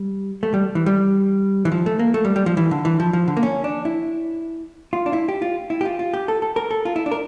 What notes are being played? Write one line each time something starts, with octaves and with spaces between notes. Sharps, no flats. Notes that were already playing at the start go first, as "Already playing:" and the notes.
Already playing: G3
A3
G3
E3
G3
E3
F3
A3
A#3
A3
G3
G3
F3
E3
D3
E3
F3
F3
D3
A#3
C#4
D4
E4
F4
D4
E4
G4
F4
E4
G4
F4
F4
G4
A4
A4
A#4
A4
F4
E4
D4
A#4